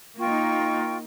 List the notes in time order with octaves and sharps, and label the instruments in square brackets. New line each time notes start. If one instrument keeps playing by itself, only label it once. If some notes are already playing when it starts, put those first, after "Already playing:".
[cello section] A#3 D#4 [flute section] F4 G5 C#6